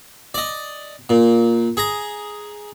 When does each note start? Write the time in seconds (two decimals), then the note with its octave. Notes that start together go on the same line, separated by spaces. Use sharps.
0.34 D5 D#5
1.09 A#2
1.77 G#4 A#5